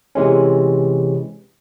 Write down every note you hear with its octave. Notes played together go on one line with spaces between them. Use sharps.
C3 E3 G#3 C#4